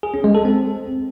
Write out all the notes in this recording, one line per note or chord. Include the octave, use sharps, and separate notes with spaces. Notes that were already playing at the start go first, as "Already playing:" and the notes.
G#4
C#4
G#3
A4
C4